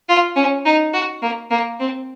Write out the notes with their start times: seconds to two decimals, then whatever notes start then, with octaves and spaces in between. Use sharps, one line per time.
0.09 F4
0.36 C#4
0.65 D#4
0.93 F#4
1.22 A#3
1.51 A#3
1.80 C4